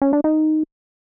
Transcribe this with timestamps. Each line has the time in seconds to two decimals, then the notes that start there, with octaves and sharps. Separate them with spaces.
0.02 C#4
0.13 D4
0.24 D#4